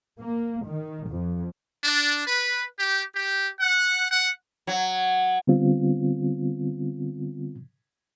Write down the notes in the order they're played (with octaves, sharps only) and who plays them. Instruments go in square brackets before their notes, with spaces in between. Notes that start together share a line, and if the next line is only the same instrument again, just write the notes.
[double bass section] A#3
D#3
F2
[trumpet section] D4
B4
G4
G4
F#5
F#5
[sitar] F#3
[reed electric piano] D3 G3 B3 C4 F4